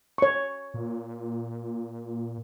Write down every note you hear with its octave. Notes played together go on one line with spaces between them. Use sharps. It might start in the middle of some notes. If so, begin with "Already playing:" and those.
C#5 C#6
A#2